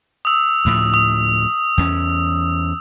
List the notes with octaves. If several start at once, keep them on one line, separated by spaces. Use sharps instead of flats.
D#6 E6
D2 A2 F3
D#6
E2 A3 C#4